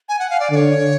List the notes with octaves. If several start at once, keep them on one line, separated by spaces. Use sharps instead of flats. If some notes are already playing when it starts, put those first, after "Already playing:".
G#5
F#5
F5
D5
D3 C#5 D5